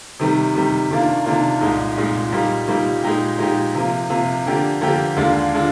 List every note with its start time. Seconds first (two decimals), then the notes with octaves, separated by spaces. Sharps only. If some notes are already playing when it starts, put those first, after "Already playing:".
0.20 C3 D#3 G3
0.54 C3 D#3 G3
0.90 C3 D#3 A#3 D4 F4
1.26 C3 D#3 A#3 D4 F4
1.61 C2 A#2 G#3 D#4
1.97 C2 A#2 G#3 D#4
2.32 A#2 G3 A#3 D#4
2.68 A#2 G3 A#3 D#4
3.04 A#2 G#3 D#4 G4
3.39 A#2 G#3 D#4 G4
3.74 C3 F3 A#3
4.10 C3 F3 A#3
4.46 D3 F3 A#3 D4 G4
4.81 D3 F3 A#3 D4 G4
5.17 D#2 D3 G#3 D4 F4
5.54 D3 G#3 D4 F4